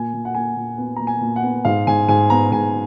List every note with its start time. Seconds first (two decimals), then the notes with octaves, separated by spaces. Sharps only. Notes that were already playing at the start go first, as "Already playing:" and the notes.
Already playing: A#2 G#5
0.13 A#2
0.25 F#5
0.35 A#2 G#5
0.56 A#2
0.78 B3
0.96 A#2 A#5
1.07 G#5
1.21 A#2
1.36 F#5
1.43 B3
1.65 G#2 F5
1.87 G#2 G#5
2.08 G#2 G#5
2.30 B3 A#5
2.52 G#2 G#5